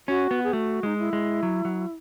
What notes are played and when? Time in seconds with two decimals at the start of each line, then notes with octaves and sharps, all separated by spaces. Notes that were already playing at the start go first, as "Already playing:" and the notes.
0.08 C#4 F#4
0.31 B3
0.44 G#4
0.53 A3 F#4
0.83 G#3 D#4
0.98 E4
1.13 G#3
1.43 F#3
1.65 F#3